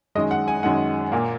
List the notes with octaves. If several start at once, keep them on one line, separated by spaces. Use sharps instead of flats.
F#2 D#3 G#3 D#5
F#5
G#5
F#2 D#3 G#3 F#5
A#2 A#3